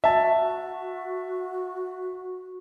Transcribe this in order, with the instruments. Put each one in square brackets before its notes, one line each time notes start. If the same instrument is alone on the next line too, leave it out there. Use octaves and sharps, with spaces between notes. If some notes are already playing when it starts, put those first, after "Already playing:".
[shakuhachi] F#4 [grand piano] E5 A5